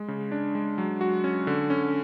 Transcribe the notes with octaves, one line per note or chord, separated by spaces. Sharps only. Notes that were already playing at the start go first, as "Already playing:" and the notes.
Already playing: G#3
C#3
D4
G#3
F#3
F#4
C#4
D3
C#4